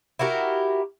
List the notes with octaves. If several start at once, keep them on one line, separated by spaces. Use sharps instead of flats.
E4 F#4 G4 A#4